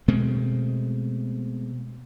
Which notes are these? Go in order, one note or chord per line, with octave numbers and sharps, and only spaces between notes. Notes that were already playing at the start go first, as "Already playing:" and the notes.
B2 G#3 A3 C4